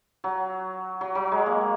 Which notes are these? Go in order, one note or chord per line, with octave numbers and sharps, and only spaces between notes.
F#3
F#3
F#3
G#3
A#3